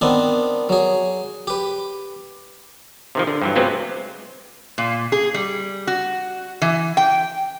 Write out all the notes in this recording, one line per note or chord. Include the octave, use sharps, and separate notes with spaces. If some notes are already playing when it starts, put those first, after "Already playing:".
D#3 B3 C4 D4
F#3 G#4
G4 B4
C3 D#3 F3
D3
G2 E3 F#3
C3 F#3 G#3 B3 C4 F4
A#2
G#4
G3
F#4
E3
G5